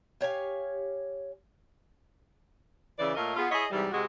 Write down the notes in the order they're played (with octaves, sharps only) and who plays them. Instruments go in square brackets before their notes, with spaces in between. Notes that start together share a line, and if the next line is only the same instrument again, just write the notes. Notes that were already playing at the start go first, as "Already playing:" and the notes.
[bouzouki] G4 C#5 F5 G#5
[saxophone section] C#3 E3 D5
A#2 A3 A#4 C#5 D#5 F5
B3 F4 G#4
E4 G#4 C#5 D#5
G#2 C3 E3 G3
C3 G#3 F#4